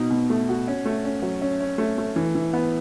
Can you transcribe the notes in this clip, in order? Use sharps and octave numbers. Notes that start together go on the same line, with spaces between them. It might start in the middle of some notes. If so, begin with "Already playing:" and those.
Already playing: B2 D#4
B2
A3
F#4
C#4
A3
C#4
F#3
C#4
C#4
A3
A3
E3
E3
B3